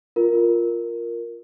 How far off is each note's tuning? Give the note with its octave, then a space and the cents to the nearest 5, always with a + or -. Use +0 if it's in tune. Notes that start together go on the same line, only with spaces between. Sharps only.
F4 +0 A#4 +0